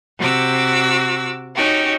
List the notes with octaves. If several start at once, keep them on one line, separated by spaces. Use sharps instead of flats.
C3 F#4 D6 E6
C#4 D#4 F#4 G4